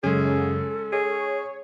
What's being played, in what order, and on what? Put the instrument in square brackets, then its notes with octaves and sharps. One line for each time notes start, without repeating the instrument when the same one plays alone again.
[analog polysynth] F#2 C#3 [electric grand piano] G#3 C#4 [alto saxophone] G#4 [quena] A4
[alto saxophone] G#4 [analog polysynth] C#5